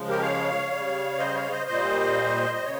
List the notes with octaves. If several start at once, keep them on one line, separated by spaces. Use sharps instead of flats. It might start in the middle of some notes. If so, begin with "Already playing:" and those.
Already playing: C#3 F3 G#3
G4 A#4
C#5 F5
C#3 G3
C5 D#5
C#5 F5
C5 D#5
A#2 G3 C5 D#5
C5
C#3 C#5